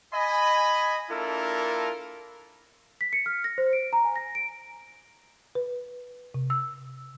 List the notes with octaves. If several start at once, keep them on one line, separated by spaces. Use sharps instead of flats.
D#5 G#5 B5
A#3 D4 E4 F4 A4 A#4
B6
C#7
F6
A#6
C5
D7
A#5
G#5
A#6
D7
B4
C3
E6